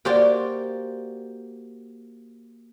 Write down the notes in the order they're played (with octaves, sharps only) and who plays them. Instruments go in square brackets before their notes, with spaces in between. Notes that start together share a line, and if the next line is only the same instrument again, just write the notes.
[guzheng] A#3 F#4 G4 C5 D5 G5